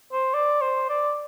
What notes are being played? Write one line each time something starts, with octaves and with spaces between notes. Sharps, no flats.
C5
D5
C5
D5